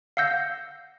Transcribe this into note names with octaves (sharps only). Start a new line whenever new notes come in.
F5 F#5 E6 G6 A#6